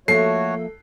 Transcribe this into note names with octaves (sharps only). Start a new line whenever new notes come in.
F3 A3 A#3 F#4 A4 C#5 E5 C7